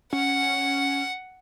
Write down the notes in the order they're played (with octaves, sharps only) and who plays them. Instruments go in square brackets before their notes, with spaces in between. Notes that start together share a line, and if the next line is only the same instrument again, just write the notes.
[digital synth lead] C#4 [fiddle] F#5